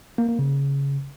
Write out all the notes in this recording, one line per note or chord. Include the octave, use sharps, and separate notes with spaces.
A#3
A#3
C#3